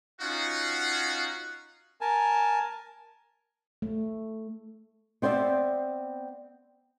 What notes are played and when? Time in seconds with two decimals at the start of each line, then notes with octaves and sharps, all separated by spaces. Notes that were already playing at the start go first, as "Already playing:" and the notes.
0.21 C#4 D#4 F4 F#4 F5 F#5
2.01 A#4 G#5 A5
3.82 A3
5.22 B3 C4 C5 D5 E5